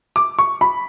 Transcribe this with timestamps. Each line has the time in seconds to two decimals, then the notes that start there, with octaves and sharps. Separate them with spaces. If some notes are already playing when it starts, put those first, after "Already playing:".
0.16 D6
0.39 C#6
0.61 B5